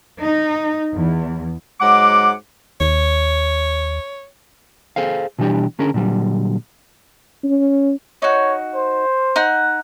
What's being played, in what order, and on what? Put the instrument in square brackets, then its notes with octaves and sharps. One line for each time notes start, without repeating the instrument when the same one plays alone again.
[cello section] D#4
E2
[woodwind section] G#2 F#3 G#3 F#5 D6
[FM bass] D#2 [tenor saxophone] C#5
[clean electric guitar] G#4 A4 C5 F5
B2 E3 G3 D4 G4
D3 C#4 G#4 A#4
A#2 D3 F#3 G3
[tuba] C#4
[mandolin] D#4 F#4 [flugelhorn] C#5
[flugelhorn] C5
[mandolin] D#4 F#5 F#6